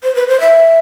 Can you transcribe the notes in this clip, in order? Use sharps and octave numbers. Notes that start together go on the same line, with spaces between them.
C5
B4
C5
E5